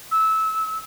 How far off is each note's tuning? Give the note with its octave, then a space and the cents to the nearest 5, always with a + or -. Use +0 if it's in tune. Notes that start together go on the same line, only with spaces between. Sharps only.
E6 -20